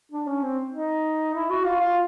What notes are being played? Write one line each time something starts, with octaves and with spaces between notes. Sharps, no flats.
D4
C#4
C4
D#4
E4
F#4
F4
F4